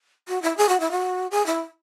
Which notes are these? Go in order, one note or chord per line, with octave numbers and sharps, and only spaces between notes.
F#4
E4
G#4
F#4
E4
F#4
G#4
E4